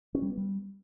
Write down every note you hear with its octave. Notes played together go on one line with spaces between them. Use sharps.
C#4
G3
B3
G3